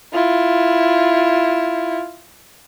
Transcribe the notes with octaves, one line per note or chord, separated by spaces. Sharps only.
E4 F4